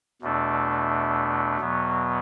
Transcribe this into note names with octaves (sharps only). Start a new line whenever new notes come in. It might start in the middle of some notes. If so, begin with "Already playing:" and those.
E2 B2 A3 D4
E2 B2 F#3 B3